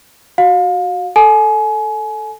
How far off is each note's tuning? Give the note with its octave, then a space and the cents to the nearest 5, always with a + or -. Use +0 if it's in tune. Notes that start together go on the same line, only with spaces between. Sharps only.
F#4 +0 F5 +30
A4 +0 G#5 +30